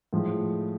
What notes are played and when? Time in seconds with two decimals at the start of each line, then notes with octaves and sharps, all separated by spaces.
0.13 A2 F3 G#3